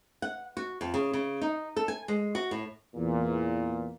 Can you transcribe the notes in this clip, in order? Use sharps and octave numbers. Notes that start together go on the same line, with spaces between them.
F#5
F#4
F2
C#3
C#3
D#4
A4
G#5
G#3
F#4
A2
E2 A#2